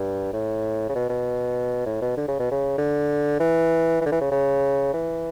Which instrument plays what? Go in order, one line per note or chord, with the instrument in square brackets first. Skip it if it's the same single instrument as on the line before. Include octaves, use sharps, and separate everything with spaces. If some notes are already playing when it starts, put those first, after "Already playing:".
Already playing: [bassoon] G2
A2
C#3
B2
B2
A2
B2
D3
C#3
B2
C#3
D3
E3
E3
D3
E3
C#3
C#3
E3